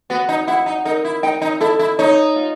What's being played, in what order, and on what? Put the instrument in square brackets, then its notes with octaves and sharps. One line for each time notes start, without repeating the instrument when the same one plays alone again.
[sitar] B3 [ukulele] F#4
[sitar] D#4
[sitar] E4 [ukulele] F#5
[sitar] D#4
[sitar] D#4 [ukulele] A#4
[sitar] E4
[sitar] D#4 [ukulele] G5
[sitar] D#4
[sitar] E4 [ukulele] A4
[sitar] E4
[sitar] D#4 [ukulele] C#5
[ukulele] F4